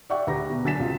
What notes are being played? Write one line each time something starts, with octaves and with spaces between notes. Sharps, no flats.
D5 E5 F#5 G5 C#6
D2 G4 B4 A#5 A#6
B2
D3 F#3 G#5 A6 B6 E7
C#2 C3 F4